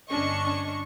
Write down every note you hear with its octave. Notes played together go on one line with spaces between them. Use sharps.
G1 C#4 D4 D#5 C#6 C#7